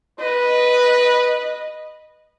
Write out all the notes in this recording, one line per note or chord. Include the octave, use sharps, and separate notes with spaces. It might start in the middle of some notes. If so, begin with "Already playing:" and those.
B4 D#5